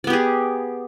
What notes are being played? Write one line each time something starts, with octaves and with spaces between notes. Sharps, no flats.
B3 G4 G#4 D5